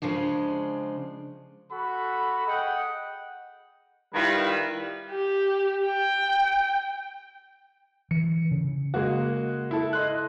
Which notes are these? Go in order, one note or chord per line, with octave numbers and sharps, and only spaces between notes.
C#3 F3 G#3 D4
F#4 A4 B5
G#4 D#5 F#5 G5 D#6
D#3 G3 E4 F4 B4
G4
G5
E3 C#7
C#3
G#3 A#3 F#4
E4 A4
D#5 C6 F#6